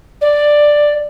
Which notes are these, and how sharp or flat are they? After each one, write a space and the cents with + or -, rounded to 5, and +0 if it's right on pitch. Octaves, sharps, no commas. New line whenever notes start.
D5 +5